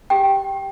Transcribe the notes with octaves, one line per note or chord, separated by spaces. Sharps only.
G4 G5